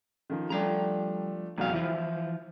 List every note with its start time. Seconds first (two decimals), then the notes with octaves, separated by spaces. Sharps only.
0.30 D#3 F3
0.50 F3 G3 A3 D4 A#5
1.58 F1 E2 G#2 F#3 F5
1.73 E3 F3 E4